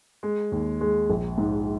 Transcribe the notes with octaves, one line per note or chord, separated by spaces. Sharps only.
G#3
D#2
G#3
A#1
G#2